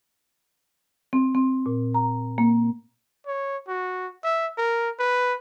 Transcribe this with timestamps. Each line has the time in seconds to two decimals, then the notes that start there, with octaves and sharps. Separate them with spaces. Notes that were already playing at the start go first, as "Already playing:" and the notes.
1.13 C4
1.35 C4
1.66 A#2
1.94 A#5
2.38 A#3
3.27 C#5
3.68 F#4
4.24 E5
4.58 A#4
4.99 B4